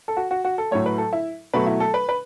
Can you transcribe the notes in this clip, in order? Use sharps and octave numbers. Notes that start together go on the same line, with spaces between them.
A4
F#4
F#4
F#4
A4
A2 F#3 A3 C#5
B4
A4
E4
B2 F#3 A3 B4
E4
A4
B4
B4